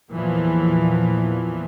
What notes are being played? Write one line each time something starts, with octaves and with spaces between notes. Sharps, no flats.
E2 A#2 E3 F3